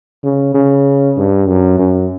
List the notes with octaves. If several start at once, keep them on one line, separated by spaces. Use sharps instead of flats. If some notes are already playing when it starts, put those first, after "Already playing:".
C#3
C#3
G2
F#2
F#2